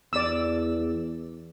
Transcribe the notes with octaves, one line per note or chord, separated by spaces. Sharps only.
E2 D5 E6